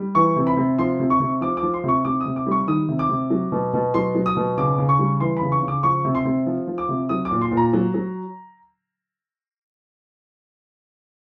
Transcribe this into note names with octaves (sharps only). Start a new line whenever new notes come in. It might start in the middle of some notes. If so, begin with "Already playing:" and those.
Already playing: G3
E3 C#6
C3
B5
C3
F3 C6
C3
C#6
C3
F3 D6
D6
F3
C6
C3 C#6
C3 D6
D#6
C3
D6
G3 C#6
D#3 D#6
C3
D6
C3
F#3
B2
B2
F#3 C6
F#3
D#6
B2
C#3 D6
C#3
C#6
G3
E3 C6
C#3 B5
C#6
C#3
D6
F3 C#6
C3
C6
C3
F3
F3
D6
C3
F#3 D#6
D6
A#2
C6
A#2
A#5
F#3
F#3